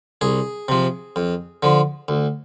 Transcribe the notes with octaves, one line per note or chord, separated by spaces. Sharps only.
C2 G#4
C3 F3
F2
D3 F3
D2